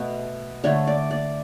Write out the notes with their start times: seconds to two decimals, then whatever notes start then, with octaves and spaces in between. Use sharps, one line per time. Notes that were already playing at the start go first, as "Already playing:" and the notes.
Already playing: B2 A3
0.64 D3 A3 C#5
0.87 D5
1.11 D5